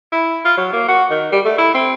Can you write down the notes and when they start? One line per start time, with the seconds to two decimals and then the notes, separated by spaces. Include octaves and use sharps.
0.12 E4
0.45 F4
0.57 F#3
0.73 A#3
0.88 F#4
1.10 D#3
1.32 G3
1.45 A3
1.58 E4
1.74 C4